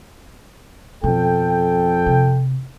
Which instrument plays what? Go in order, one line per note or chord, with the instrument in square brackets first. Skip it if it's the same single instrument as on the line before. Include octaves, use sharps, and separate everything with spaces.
[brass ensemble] F2 A4 G5 [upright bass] B2
[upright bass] C3